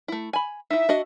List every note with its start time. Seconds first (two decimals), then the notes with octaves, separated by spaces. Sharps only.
0.08 A3 E4
0.33 G#5 B5
0.70 D#4 E4 E5
0.89 D4 F#4 D#5